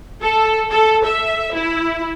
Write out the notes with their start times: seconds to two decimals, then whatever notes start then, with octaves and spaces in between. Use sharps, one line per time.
0.23 A4
0.70 A4
1.05 E5
1.54 E4